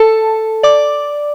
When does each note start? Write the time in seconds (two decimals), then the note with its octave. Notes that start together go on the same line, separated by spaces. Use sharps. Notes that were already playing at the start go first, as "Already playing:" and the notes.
Already playing: A4 A5
0.63 D5 D6